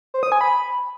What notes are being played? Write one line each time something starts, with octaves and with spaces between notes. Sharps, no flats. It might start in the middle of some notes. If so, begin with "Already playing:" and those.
C5
D#6
G#5
B5